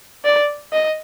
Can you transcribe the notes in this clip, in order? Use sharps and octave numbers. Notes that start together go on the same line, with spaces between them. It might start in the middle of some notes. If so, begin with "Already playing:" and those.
D5
D#5